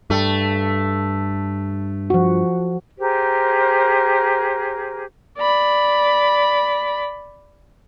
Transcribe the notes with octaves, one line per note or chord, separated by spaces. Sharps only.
G2 A3
F3 F#4
G4 G#4 A#4 C5
D5 B5